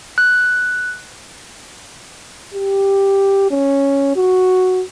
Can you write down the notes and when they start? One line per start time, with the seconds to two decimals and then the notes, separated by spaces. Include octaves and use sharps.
0.18 F#6
2.54 G4
3.51 C#4
4.16 F#4